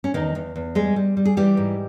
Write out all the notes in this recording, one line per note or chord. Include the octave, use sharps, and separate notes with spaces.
C#4
E2 D#3 D#4
E2
E2
G3 G#3 G#4
G3
G3
G#4
E3 G3 G4
G#2